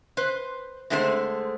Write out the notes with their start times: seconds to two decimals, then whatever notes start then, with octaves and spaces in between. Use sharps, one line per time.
0.17 B4 C5
0.90 D3 G#3 A3 C4 G4 C5